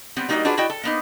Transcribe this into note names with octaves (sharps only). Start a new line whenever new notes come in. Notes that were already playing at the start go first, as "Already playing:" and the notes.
G3 B3 C4
G3 A#3 D#4 F4 F#4 D#5
D4 F4 F#4 G#4 B4
E4 F#4 D5 D#5 G5
A4
A#3 B3 D#4